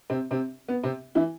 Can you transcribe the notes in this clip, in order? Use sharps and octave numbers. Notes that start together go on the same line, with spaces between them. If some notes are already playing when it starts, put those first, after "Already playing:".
C3 C4
C3 C4
B3
C3 C4
E3 E4